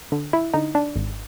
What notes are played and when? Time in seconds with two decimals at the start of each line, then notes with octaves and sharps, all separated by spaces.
0.12 D3
0.33 E4
0.54 D3 D#4
0.75 D4
0.96 G#1